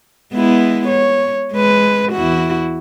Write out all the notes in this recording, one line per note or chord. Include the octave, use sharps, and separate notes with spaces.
G#3 B3 E4
C#5
G#3 B4
E2 E4 F#4